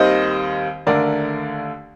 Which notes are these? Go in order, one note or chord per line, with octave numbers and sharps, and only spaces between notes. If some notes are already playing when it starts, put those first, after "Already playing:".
Already playing: D#2 D#3 G3 C4 C5 D#5
D#2 D3 A3 D4 A#4 D5